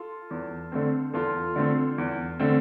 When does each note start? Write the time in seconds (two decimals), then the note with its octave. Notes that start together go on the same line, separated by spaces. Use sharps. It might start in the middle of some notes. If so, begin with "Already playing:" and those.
Already playing: F4 A4
0.30 E2
0.72 D3 A3 C4
1.13 E2 F4 A4
1.56 D3 A3 C4
1.98 E2
2.40 D3 A3 C4